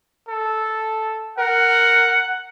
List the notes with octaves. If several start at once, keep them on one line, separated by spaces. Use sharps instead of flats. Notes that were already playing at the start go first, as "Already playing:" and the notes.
A4
A#4 F#5